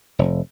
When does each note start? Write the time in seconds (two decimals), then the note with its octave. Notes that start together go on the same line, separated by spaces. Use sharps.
0.19 F1